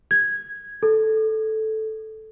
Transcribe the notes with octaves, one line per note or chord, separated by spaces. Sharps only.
G#6
A4